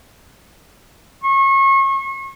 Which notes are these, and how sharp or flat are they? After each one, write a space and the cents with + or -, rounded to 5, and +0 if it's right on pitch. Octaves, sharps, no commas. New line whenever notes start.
C#6 -35